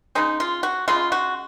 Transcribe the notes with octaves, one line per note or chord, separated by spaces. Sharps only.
C#3 G#3 D#4
F4
F#4
C#3 G#3 F4
F#4